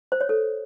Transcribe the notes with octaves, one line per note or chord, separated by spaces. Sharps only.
C5
C#5
A4